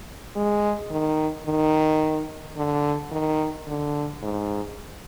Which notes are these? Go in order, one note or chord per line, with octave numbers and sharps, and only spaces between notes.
G#3
D#3
D#3
D3
D#3
D3
G#2